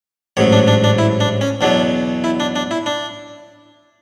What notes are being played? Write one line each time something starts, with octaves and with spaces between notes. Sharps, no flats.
A1 G#2 F#3 C#5
D4
D4
D4
E4
D4
C#4
E2 B2 F#3 D4
E4
D4
D4
E4
D4